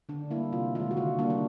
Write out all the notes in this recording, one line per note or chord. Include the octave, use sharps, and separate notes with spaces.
D3 D4
A#3 E4
G3
C3 F4
D#3 G#3 F4
F#4
D3 F4
G3 A#3 D4
D4